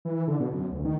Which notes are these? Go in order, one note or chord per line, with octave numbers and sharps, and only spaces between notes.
E3
D3
B2
F#2
D2
D#3